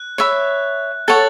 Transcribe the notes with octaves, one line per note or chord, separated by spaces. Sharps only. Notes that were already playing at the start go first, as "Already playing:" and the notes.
Already playing: F#6
C#5 E5 B5
A4 C#5 F#5 A6